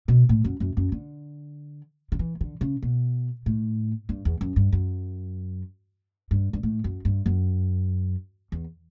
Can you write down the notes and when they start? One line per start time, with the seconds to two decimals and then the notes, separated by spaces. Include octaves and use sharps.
0.08 B2
0.29 A2
0.44 F#2
0.60 F#2
0.77 F#2
0.92 D3
2.12 D3
2.19 E3
2.41 D3
2.61 C#3
2.82 B2
3.46 A2
4.09 G2
4.25 E2
4.41 F#2
4.56 G2
4.72 F#2
6.31 G2
6.53 G2
6.63 A2
6.84 F#2
7.05 G2
7.26 F#2
8.52 E2